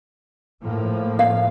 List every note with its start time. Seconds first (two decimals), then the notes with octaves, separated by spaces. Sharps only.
0.63 A2 F3 A#3
1.19 F5